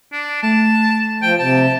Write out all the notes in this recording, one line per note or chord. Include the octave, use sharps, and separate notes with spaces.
D4
A3 A5
F3 G5
C3 A5